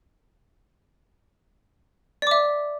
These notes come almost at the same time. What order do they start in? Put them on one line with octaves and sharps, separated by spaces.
D5 D6 E5